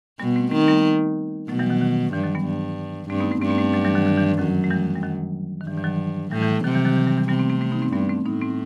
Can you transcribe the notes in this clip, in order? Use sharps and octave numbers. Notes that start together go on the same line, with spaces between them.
B2 G3 B3
A3 C4
D#3 A3 C4
G3 B3
B2 F#3 A3
E3 G3
D#3 F#3
D#3
G2 E3
D#3 F#3
G3 B3
G2
G2 A3 C4
B3 D#4
A3 C4
G2 A3 C4
B3
A3 C4
F#3 A3
E3 G3
D#3 F#3
D#3 F#3
E3
F#2 D#3 F#3
A3
E3 G3
G3
D#3 F#3
D#3
G2 E3
E3
D#3 F#3
A2 E3 G3
E3
E3
C3 D#3 F#3
E3 G3
D#3 F#3
E3
E3 G3
E3 G3
C3 G3 B3
A3 C4
A3 C4
A3 C4
B3 D#4
A3 C4
G2 G3 B3
A3 C4
A2 B3 D#4
A3 C4